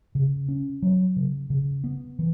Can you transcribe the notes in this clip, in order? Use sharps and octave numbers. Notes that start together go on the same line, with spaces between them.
C#3
C#4
F#3
C#3
C#3
B3
E3